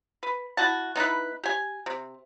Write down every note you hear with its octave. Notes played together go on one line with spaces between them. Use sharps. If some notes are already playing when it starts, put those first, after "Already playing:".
B4
E4 F#4 A5
B3 D#4 E4 B4
G4 G#5
C3